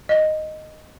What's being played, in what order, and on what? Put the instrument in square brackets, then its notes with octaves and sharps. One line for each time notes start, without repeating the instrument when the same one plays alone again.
[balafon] D#5